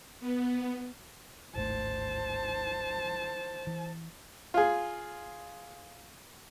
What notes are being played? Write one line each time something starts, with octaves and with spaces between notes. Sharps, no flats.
B3
D1 G#1 A3 C5 A5
E3
F4 G#4